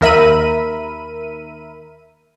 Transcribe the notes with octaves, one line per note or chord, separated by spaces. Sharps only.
D#2 A#4 E5 B5 D#7